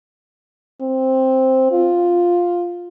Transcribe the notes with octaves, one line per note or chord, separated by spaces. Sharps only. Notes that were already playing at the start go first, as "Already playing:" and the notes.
C4
F4